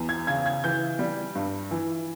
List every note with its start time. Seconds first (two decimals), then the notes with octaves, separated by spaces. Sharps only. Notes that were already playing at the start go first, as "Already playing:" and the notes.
Already playing: E2
0.09 G#6
0.27 C#3 G#6
0.46 G#6
0.64 E3 G6
0.99 G3
1.35 G2
1.71 E3